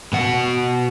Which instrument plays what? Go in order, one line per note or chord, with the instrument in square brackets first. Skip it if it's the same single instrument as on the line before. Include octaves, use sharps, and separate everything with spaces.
[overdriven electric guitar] B2 F#5